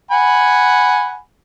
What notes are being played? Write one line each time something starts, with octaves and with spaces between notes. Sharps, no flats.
F#5 G#5 B5